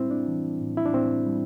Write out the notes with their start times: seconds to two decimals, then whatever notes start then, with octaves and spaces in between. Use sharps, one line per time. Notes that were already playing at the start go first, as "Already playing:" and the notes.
Already playing: A2 G3 C4 E4
0.11 D4
0.28 E3
0.60 A2
0.77 E4
0.86 D4
0.93 A2 C4
1.27 G3